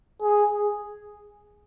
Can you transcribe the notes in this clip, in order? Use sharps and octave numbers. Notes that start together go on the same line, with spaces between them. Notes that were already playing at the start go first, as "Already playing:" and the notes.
G#4